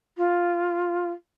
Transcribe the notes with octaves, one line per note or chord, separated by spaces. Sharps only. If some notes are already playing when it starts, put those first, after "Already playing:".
F4